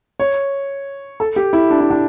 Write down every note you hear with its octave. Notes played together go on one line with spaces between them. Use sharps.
C#5
A4
G4
E4
D4
E4
D4